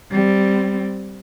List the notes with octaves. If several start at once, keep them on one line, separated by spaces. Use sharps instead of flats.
G3 C4